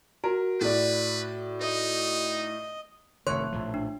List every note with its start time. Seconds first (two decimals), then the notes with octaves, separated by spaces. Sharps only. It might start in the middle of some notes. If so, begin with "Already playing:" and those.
0.24 F#4 A#4
0.61 A2 B4 D5
1.61 D#4 D#5
3.27 F1 G#2 D#3 A3 C#5 C6 F#6
3.52 A#1 A2 F3
3.74 D4